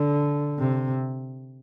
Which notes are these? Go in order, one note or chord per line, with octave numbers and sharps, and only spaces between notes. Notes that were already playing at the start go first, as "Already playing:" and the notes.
Already playing: D3
C3